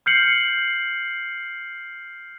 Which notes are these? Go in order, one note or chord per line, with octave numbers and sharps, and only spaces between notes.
F6 G6 C7 C#7 F#7